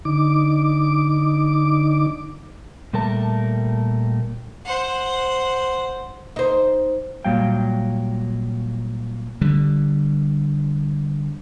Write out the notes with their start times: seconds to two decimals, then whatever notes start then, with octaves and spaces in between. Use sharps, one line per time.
0.05 D3 D#4 D6
2.93 A#2 G3 A3 A#4 A5
4.65 C5 F#5
6.36 D#4 C5
7.24 A#2 F#3 G3 F5 G5
9.41 D3 G3